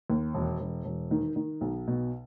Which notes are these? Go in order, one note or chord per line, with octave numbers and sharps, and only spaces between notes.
D#2
E1
E1
E1
D#3
D#3
B1
B2